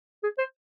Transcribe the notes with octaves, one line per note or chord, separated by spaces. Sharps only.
G#4
C5